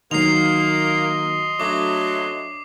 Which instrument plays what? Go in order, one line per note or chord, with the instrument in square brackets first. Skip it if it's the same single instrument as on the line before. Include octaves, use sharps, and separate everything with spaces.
[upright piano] D#3 F#3 [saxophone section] A#3 [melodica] D#5 C6 [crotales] C7 F7
[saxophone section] F#3 A3 [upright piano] D4 [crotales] D6